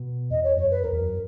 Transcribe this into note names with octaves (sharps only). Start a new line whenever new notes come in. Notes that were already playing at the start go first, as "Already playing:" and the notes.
Already playing: B2
E2 D#5
C#5
F#2 C#5
B4
E2 A#4
E2
F#2